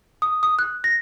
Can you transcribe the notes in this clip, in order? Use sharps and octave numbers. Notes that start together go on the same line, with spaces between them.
D#6
D#6
F#6
A#6